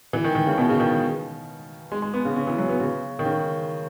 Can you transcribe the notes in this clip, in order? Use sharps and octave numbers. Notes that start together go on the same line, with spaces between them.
E3
D#3
D#3
C#3
B2
C#3
D#3
G#3
G#3
B3
C#3
C#3
E3
F#3
B3
C#3
D#3
C#3